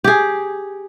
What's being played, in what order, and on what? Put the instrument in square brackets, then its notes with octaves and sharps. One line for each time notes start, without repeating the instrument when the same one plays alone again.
[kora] G4 G#4